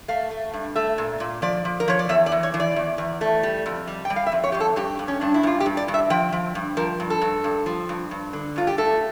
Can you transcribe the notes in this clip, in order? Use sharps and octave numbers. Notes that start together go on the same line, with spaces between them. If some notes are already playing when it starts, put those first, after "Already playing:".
A3 F5
A3
G2
A3 E5
A#2
A#2
F3 D5
F3
A#4
F3 C#5
D5
E2 E5
D5
E3
C#5
E3
D5
E2
E2
A3
G3
F2
G3
G5
G3
F5
E5
F2
C#5
F2 G4
A4
G2 G4
G2
C#4
G2 D4
E4
G2 F4
G4
G2
D5
G2
E5
F3 G5
F3
G2
F3 A#4
G2
A4
G2
G2
F3
G2
G2
D3
G2 F4
G4
A3 A4